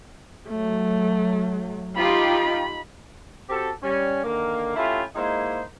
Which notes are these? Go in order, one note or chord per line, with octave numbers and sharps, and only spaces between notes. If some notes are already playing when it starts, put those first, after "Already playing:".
F#3 A3
D#4 F4 G4 B5
C4 F#4 G4 A4
G3 C#4
D3 D#3 A#3
A3 C#4 E4 F4 G4
G#3 A#3 D#4 E4 C5